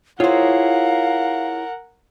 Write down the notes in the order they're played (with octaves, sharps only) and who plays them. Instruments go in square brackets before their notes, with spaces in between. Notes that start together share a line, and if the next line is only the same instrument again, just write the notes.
[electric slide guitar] E4 G#4 C#5 [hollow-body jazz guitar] F4 C5 [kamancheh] A#4 F#5 [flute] F5